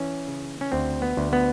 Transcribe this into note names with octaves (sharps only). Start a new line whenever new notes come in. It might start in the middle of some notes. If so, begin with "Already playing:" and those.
Already playing: E3 C#4
C#3
C#4
D2 C4
B3
D2
B3